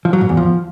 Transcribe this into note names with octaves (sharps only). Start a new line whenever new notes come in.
F3
F#3
G#2
E2
F3